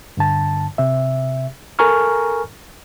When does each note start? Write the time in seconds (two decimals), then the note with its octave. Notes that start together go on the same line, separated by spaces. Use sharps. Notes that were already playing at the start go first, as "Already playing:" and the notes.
0.17 G2 D3 A5
0.78 C3 E5
1.79 A4 A#4 G#5 A#5 C#6 F6